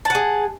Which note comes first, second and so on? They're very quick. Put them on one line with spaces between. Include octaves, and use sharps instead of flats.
A5 F#5 G#4